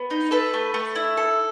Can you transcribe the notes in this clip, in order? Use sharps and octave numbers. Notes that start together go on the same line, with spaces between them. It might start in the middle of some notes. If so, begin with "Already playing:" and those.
Already playing: B3
D#4
A4 B4
A3
A3
E4
A4